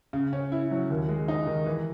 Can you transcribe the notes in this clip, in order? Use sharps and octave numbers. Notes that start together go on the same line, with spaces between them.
C#3
C#4
E4
F#3
D#2
G#3
D#4
D#3
E3